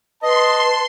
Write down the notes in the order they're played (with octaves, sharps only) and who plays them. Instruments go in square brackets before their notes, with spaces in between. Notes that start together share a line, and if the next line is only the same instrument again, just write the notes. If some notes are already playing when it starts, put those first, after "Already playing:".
[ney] B4 [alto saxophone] D#5 [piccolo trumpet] A5 [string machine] C6